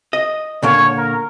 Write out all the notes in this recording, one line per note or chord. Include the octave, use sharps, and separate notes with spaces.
D#5
A#2 D3 A#3 C#5
A#4